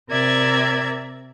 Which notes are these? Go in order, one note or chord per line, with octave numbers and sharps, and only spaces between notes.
C3 A#4 D5 E5 G#6